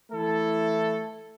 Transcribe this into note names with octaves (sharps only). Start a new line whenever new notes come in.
E3 A3 E4 A4